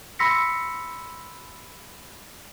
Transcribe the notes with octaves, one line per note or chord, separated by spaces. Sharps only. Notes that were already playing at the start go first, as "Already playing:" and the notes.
B5 C6 E6 A#6 B6 C#7